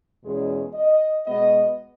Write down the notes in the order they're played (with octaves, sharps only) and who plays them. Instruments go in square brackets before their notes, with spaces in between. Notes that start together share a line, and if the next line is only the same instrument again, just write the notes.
[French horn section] E2 B2 G#3 C#4 G#4
D#5
B2 G#3 B3 D#5